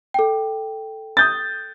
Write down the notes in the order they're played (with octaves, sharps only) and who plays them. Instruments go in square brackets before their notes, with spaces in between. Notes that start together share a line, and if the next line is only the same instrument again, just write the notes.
[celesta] A4 G5
[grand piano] D#6 G6 A6